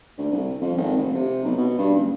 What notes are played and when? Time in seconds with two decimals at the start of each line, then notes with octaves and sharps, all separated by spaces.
0.18 D2
0.32 C2
0.61 F2
0.77 G#1
0.96 F1
1.14 C3
1.44 B1
1.58 B2
1.78 G2
1.94 F#1